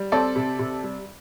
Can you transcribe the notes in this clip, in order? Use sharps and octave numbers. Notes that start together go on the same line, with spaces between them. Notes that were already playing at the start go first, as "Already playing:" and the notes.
Already playing: G3
C4 A4 D5
C3
C3
G3